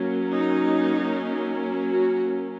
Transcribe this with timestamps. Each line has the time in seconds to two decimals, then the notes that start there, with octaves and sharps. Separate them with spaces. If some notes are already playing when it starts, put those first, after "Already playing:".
Already playing: F#3 A#3 C#4
0.33 D#4
1.92 F#4